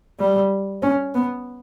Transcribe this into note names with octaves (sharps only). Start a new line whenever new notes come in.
G3
C#4
B3